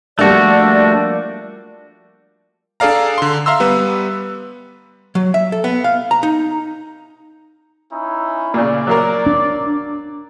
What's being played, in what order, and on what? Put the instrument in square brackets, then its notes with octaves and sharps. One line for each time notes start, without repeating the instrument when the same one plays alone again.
[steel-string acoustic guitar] F3 G3 A#3 [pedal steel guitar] A3 F#4 [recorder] D4 [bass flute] D5
[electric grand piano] D4 G#4 A4 D5 F5 A#5
D3 C6
E5 F5 A#5 C6 E6
G3 B3 B4
[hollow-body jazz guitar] F#3
E5
A4
B3
F5
A#5
D#4
[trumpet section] C#4 D#4 E4
[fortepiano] A#2 C#3 [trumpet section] D5
[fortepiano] F#3 A#3 A#4
[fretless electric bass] D4